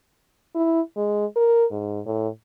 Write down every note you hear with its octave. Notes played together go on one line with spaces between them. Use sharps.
E4
G#3
A#4
G#2
A2